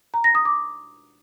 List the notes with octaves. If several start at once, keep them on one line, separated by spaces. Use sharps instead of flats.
A#5
A#6
D#6
D6